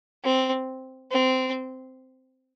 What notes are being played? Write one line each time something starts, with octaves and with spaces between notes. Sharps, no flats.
C4
C4